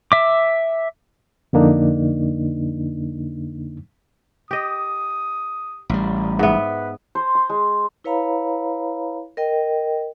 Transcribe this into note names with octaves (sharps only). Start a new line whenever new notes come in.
E5 D6
F2 D3 A#3 D4 D#4
G4 D#5 D#6
A1 G3
G#2 B3 B4 E5 F#5
C5
C6
G#3
E4 B4 C#5 F5 A#5 B5
A#4 D#5 G5